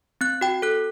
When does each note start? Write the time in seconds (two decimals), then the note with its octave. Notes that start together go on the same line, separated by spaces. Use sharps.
0.21 C4 F#6
0.41 F#4 G5
0.62 A4 F#6